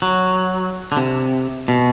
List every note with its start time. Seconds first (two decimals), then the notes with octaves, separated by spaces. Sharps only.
0.02 F#3
0.92 D3
0.97 C3
1.68 B2